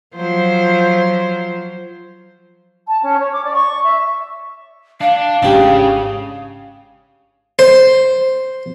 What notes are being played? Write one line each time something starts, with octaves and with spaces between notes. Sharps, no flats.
F3 F#3 C5
A5
C#4
C#5
D6
D5
C#6
E5
D4 F5
G#1 C#3 D4 G4
C5